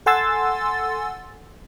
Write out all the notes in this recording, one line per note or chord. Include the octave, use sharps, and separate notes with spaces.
A4 F#5 G#5 C6 E6 A6